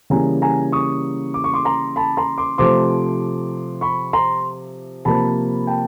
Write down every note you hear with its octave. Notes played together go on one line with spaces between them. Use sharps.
C#3 E3 G3 A#3 G#5 A#5
G#5 A#5
C#6 D#6
D6
C#6
C6 D6
A#5 C6
A5 B5
A#5 C6
C6 D6
C3 F3 A3 C4 C6 D6
B5 C#6
A#5 C6
C3 F3 A#3 A5 B5
G5 A5